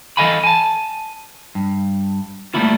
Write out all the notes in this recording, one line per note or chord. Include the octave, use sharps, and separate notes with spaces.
E3 A4 D#5 F5 G#5 B5
G#5 A5
G2
G3 A3 A#3 E4 F4